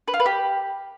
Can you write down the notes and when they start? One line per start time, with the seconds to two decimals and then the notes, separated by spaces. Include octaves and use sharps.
0.08 B4
0.14 F4
0.20 B4
0.26 G4